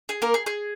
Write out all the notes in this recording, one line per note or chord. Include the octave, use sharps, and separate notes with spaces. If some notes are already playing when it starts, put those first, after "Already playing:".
G#4
A#3 A#4
G#4
G#4